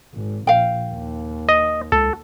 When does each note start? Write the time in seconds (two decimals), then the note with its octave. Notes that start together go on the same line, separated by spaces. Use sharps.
0.14 G#1
0.47 A#1 F5 G5
0.92 D#2
1.49 D#5
1.92 C#2 A4